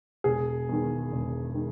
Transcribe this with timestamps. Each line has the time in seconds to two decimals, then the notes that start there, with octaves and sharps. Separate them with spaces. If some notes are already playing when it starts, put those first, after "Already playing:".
0.24 E1 G#4
0.69 E2 D#3
1.12 E1
1.54 D#3